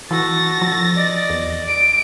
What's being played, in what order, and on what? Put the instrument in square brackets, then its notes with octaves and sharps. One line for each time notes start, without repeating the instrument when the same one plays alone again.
[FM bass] E3 [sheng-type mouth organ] F#4 A4 [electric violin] A6 A#6
[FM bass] F3
[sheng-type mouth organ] D5 D#5
[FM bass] E2
[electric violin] D7